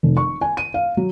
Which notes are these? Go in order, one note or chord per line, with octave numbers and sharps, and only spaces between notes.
F1
C#6
G#5
D#7
F5
F#3